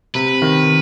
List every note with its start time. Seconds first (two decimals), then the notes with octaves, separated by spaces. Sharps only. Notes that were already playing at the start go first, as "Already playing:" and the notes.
0.15 C3 B4
0.42 D#3